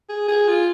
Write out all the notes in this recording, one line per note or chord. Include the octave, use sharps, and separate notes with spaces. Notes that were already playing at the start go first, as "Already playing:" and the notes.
G#4
G#4
F4